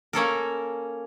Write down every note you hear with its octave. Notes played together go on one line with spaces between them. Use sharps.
A#3 C#4 A4 A#4